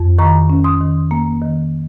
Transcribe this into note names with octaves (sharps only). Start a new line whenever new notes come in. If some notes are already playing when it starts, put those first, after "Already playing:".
Already playing: F2
D#3 A#5 C#6
C#4
C6 D#6
D#3
A#3
D#3